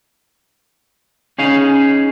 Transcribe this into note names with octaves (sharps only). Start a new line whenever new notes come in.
C#4 D#4 G#4 F5